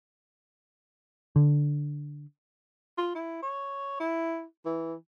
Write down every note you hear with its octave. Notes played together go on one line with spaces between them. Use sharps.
D3
F4
E4
C#5
E4
E3